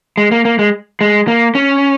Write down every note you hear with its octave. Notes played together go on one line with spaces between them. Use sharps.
G#3
A#3
A#3
G#3
G#3
A#3
C#4